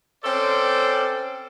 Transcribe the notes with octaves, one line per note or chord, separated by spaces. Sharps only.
C4 C#4 A4 C5 D5